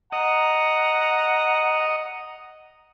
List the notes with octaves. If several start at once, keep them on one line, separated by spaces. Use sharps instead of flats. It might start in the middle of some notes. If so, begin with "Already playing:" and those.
D#5 F#5 A#5